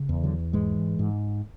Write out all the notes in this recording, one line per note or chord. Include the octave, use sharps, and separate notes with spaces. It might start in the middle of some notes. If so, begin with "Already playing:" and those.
Already playing: C#3
E2
D3 F#3
G#2 E3 G#3
G#2